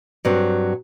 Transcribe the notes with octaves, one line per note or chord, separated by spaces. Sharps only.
G2 F#3 C4